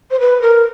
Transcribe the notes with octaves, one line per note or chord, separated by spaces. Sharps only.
C5
B4
A#4